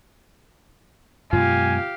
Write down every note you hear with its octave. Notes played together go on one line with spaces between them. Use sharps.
F#2 B2 G#3 F4 G4 F5 G#5